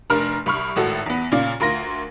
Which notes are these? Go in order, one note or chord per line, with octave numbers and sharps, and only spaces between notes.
F1 D4 A#4 F6
C2 B5 C#6 F6
G#1 A2 F#4 A4
E2 B3
A#2 C#3 F4 D5
D2 F4 A#4 C6 A#6